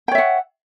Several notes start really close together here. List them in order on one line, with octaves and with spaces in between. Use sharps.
G5 C#5 E5 F#5